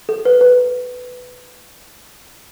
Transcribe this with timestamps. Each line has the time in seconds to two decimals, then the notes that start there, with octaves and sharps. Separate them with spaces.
0.09 A4
0.25 B4
0.41 B4